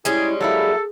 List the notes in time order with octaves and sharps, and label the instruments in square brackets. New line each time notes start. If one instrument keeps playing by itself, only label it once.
[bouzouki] G3 G#3 C#4 [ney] E4 [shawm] G#4
[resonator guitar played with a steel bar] F#3 A#3 E4 [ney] G#4 [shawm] A4